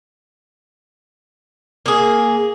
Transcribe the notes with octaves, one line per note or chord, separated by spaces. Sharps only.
A#3 G#4